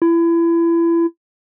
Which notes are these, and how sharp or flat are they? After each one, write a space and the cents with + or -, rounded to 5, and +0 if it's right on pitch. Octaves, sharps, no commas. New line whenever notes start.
E4 +30